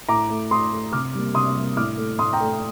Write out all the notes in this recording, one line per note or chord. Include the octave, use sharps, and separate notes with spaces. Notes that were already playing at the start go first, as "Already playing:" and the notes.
A2 A#5 D6
A3
A2 C6 D#6
A3
C3 D6 F6
G3 A#3
C3 C6 D#6
G3 A#3
A2 D6 F6
A3
A2 C6 D#6
G5 A#5
A3